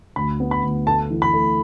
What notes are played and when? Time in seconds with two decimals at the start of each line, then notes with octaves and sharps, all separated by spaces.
0.16 D2 B5
0.40 B3
0.51 B5
0.63 D2
0.86 A3 A5
1.10 E3
1.22 B5
1.33 A3